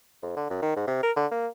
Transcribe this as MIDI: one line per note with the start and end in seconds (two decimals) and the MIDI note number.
0.23 0.35 41
0.37 0.46 50
0.50 0.60 42
0.62 0.74 51
0.76 0.83 44
0.87 1.00 48
1.03 1.11 70
1.17 1.27 50
1.31 1.47 58